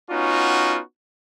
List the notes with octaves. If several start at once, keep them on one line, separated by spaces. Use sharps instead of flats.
B3 C#4 D#4 F4 F#4